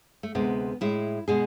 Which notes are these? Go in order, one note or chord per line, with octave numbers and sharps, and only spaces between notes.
A3
D2 C3 G#3 B3
A2 G#3 E4
B2 G#3 G#4